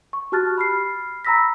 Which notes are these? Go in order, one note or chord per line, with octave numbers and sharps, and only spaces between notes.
C#6
F#4 G4 A5 F6 F#6 A6
B5 F6 C7
A#5 B5 E6 A#6 B6